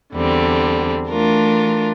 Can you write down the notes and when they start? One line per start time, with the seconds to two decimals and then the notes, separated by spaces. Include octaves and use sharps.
0.14 E2 D3 G3 C4
1.08 E3 A3 D4 F4 A#4